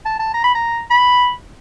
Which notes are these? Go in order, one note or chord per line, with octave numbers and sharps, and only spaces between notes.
A5
A5
A#5
B5
A#5
B5